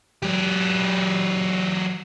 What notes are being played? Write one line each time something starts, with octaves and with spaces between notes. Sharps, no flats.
F#3 G4